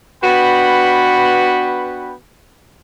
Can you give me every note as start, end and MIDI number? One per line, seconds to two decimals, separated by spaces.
0.24 2.14 59
0.24 2.14 62
0.24 2.14 66
0.24 2.14 71
0.24 2.14 79
0.24 2.14 83